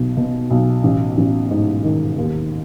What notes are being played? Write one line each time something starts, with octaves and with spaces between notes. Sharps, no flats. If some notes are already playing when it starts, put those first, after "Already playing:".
Already playing: B1 B2
B2
B1
A1
A1
G#2
D#3
D#2